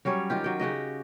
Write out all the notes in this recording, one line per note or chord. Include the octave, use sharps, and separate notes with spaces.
F#3 G3 C#4 C#5
D#3 F4 G4
F#3 G5
C#3 F#4 G4 D#5